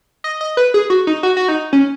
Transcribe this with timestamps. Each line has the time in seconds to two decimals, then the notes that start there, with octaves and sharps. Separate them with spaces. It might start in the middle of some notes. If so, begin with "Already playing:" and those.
0.24 D#5
0.41 D#5
0.57 B4
0.74 G#4
0.90 F#4
1.07 D#4
1.23 F#4
1.37 F#4
1.48 D#4
1.73 C#4